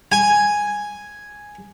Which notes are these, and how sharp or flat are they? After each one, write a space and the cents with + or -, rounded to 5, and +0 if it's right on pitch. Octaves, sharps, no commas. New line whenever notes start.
G#5 +0